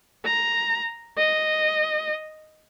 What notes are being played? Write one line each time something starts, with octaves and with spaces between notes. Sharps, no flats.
A#5
D#5